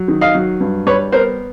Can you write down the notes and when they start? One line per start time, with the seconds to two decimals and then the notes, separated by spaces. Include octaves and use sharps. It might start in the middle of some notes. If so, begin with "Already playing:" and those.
Already playing: F#3
0.08 D#3
0.21 D#5 F5
0.35 F#3
0.60 G2
0.87 G3 B4 C#5
1.12 B3 A#4 C5